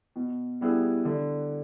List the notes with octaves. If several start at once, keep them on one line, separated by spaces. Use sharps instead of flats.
B2
G3 B3 E4 G#4
D3